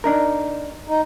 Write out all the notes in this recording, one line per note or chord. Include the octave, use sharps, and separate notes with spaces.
D4 D#4 A#4
D#4